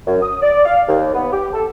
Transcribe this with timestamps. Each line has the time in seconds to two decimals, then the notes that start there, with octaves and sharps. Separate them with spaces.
0.06 F#2
0.22 D#6
0.42 D5
0.65 F5
0.87 D#2
1.14 B3
1.31 G4
1.53 A4